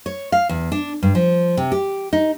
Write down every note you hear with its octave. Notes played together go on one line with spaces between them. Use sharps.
C#5
F5
E2
D4
G2
F3
C3
G4
D#4